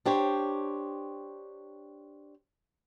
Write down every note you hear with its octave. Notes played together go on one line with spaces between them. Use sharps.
D4 G4 C5 C#5